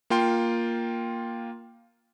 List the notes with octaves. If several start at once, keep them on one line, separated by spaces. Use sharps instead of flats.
A#3 F4 G5 C6